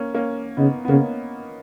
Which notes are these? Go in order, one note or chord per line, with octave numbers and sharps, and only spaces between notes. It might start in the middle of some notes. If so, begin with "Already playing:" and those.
Already playing: A#3 C#4
A#3 C#4
C#3 B3 D#4
B3
C#3 A#3 C#4